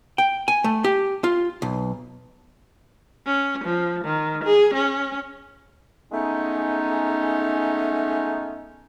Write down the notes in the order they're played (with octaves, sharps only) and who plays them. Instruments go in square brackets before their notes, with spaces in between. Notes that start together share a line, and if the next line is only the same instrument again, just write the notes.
[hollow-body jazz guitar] G5
G#5
A3
G4
F4
B1
[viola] C#4
F3
D#3
G#4
C#4
[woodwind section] G#3 A3 B3 C#4 D#4